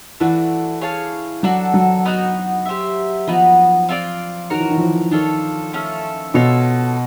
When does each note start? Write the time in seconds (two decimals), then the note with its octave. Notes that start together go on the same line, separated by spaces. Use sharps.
0.20 E3 A3 D4 F#4
0.81 G#4 C#5 F5 A5
1.43 F#3 D4 F#4 A4
1.74 F#3
2.05 B3 D#4 F#4
2.66 G4 C5 E5
3.27 F3 B3 D#4 F#4 B4
3.89 C4 F4 A4 D5
4.50 D#3 F#4 A#4 C#5
4.60 E3
4.70 D#3
4.77 F3
4.81 E3
5.11 D#3 D4 F4 A4 C#5
5.73 A3 C#4 F4 A4
6.34 B2 F4 A4 C#5